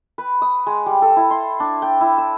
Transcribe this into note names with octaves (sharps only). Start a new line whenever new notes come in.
B4
D#6
G#3
G3
A4
E4
C6
D4
G5
E4
E6